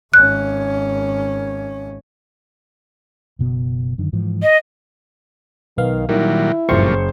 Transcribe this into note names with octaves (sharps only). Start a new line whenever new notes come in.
G#1 C#4 F#6
F#1 B2 B3
F#2 D3 D#3
G#2 E3 F3
D#5
B1 D#3 B3 F5
A#2 D#3 F#3 G3 E4
F#1 G2 A#2 F3 C5 C#6